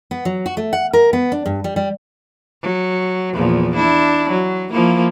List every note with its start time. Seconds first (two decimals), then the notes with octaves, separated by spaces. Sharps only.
0.11 B3
0.25 F#3
0.46 F#4
0.57 A3
0.73 F#5
0.93 A#4
1.13 B3
1.32 D4
1.46 G2
1.64 G3
1.76 G3
2.63 F#3
3.33 E2 A#2 F3
3.75 D4 E4
4.30 F#3
4.71 F3 A#3 E4